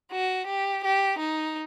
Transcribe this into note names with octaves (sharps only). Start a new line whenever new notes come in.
F#4
G4
G4
D#4